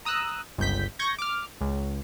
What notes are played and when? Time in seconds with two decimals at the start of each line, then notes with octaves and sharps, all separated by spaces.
0.05 A#5 D#6 E6 F#6
0.58 G1 C#2 G6 B6
0.99 C#6 G6 G#6 A#6
1.19 D6 F6
1.61 C#2